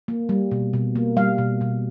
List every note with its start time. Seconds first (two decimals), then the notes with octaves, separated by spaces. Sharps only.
0.08 A#3
0.29 G3
0.51 B2
0.73 B2
0.96 A#3
1.17 G3 F5
1.38 B2
1.61 B2